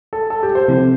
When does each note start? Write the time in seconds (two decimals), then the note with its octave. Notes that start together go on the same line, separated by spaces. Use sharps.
0.13 A4
0.30 A4
0.43 G4
0.55 C5
0.68 C3 F3 C4 E4 A4